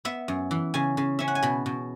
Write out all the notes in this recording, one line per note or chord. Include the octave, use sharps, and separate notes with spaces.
B3 E5
F#2
E3
C#3 G#5
C#3
C#4 E5
F#5
G#5
B2 B5
B2